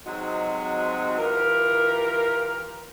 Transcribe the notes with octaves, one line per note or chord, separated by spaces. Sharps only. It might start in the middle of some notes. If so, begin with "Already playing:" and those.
C3 F#3 G#3 C4 D#4 F#4
E3 F4 G4 A#4